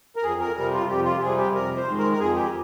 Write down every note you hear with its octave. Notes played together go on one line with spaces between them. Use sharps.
A#4
F2 G#4
A#4
C3 G3 A#4
F4
F2 G4
F4
G4
C3 G3 G#4
G4
F2 A#4
C5
D#3 G#3
A#4
A#4
F2 G#4
G4